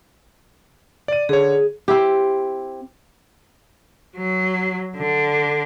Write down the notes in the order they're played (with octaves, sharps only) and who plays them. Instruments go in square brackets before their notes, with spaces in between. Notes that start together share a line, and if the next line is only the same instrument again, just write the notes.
[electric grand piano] D5 D#7
[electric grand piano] D3 C#5 [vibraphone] G#4
[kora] C4 E4 G4
[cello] F#3
D3